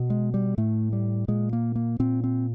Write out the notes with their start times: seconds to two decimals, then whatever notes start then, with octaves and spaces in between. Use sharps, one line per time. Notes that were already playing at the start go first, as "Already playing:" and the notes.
Already playing: B2
0.10 G#3
0.34 G3
0.58 A2 A3
0.93 G3
1.28 A#2 G#3
1.53 A#3
1.76 A#3
1.99 A#2 C4
2.24 C4